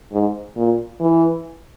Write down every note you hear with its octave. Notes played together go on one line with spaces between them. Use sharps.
G#2
A#2
E3